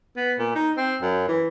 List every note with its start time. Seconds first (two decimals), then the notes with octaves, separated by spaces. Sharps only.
0.17 B3
0.39 A#2
0.55 D#4
0.77 C4
1.01 F#2
1.28 E3